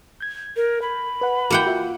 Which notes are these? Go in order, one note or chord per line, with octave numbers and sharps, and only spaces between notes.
G6 G#6
A#4
B5
B4 F#5
A#3 E4 F#4 F#5 G5
F4 F#4 E5